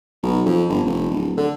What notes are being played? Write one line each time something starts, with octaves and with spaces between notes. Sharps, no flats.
B1
F2
G1
F1
D1
D3